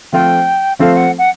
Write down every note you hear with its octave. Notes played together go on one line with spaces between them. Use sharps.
F3 A3 C4 F4 A4 G5
F3 A3 C4 F4 A4 F5
F#5
F#5